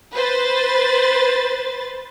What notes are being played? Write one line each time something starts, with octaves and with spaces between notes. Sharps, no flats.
B4 C5 A6